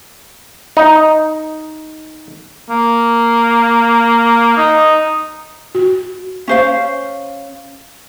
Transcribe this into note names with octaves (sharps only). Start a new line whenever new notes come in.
D#4
A#3
D#4
F#4
C#4 C5 F5